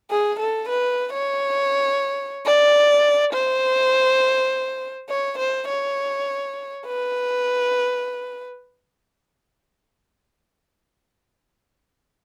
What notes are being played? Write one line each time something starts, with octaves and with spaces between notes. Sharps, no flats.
G#4
A4
B4
C#5
D5
C5
C#5
C5
C#5
B4